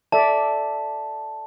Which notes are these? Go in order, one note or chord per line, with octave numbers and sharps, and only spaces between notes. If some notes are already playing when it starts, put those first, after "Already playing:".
A4 D5 E5 A5